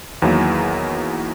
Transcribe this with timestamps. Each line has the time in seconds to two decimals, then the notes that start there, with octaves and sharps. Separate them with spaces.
0.22 E2 D#3 F#3 A#3 E4